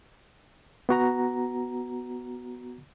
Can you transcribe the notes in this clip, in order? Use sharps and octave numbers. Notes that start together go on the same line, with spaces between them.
B3 F#4 A#5